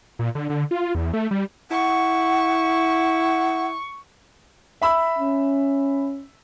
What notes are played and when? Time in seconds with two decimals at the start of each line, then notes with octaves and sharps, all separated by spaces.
0.19 A#2
0.35 D3
0.50 D3
0.71 F4
0.95 E2
1.13 A3
1.31 G3
1.71 E4 F#5 C#6
4.81 E5 B5 E6
5.19 C#4